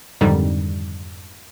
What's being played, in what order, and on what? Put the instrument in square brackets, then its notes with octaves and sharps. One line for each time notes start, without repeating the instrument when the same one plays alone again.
[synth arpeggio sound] F2 G#2 D3 D#3 G3 D#4